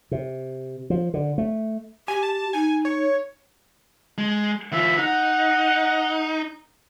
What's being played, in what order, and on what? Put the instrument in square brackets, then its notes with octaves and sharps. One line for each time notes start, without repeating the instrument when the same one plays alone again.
[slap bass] C3
F3
D3
A3
[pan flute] G4 [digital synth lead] G#5
[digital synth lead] A5
[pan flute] D#4 [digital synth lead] G#5
[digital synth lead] C#5
[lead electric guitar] G#3
[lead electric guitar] E3 F4 [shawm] E5
[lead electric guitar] D#4 [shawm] F#5